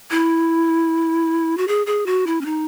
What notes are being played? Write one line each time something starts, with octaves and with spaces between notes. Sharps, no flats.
E4
F#4
G#4
G#4
F#4
E4
C#4
D#4